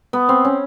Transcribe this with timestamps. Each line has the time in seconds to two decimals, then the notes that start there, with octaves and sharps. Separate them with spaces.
0.13 B3
0.29 C4
0.45 C#4